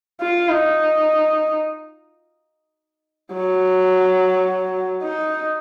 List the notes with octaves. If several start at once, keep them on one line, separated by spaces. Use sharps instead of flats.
F4
D#4
F#3
D#4